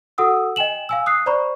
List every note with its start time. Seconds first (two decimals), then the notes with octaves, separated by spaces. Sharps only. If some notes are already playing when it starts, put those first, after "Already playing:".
0.18 F#4 A4 F#5 D#6 E6
0.56 D#5 G5 G#5 E7 F#7
0.89 F5 G#5 E6
1.06 D#6 F#6 C7
1.26 C5 D5 A#5 B5 C#6